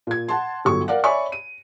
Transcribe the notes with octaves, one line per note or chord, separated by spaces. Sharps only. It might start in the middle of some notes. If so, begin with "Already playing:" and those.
A#2 G#6
F#5 A5 C6
G1 F#3 A4 C#6
A#4 D5 F5 F#5
C#5 D5 E5 G#5 B5 C#6
D#7